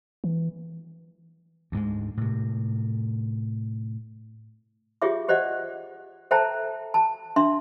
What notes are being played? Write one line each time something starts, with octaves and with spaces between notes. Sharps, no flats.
E3
D2 G#2 G#3
A2 C3
F4 G4 G#4 C#5 E5 D6
G4 C5 D5 D#5 F#5
A4 C5 E5 G5 A5 A#5
A5
D4 E5 C6